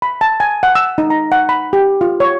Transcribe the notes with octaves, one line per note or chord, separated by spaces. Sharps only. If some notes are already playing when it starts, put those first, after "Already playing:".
B5
A5
G#5
F#5
E6
D#4
A#5
F#5
B5
G4
F4
C#5